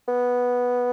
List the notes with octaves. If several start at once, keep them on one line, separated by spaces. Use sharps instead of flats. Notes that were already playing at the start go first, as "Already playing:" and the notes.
B3